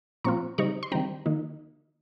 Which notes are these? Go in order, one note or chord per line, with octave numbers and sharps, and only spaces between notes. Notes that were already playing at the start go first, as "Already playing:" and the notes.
A#2 F3 C4 F4 A#5 C#6
C#3 G3 C4 D#4 A#5 C#6
C6
D#3 G3 C4 G5 A#5
D#3 A#3 D#4